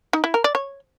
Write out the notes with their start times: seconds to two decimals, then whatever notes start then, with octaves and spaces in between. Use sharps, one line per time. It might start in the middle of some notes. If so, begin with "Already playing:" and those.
0.13 D#4
0.24 E4
0.34 A#4
0.44 D5
0.55 C#5